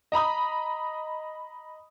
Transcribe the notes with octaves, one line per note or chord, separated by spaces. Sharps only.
D#5 A#5 B5 D#6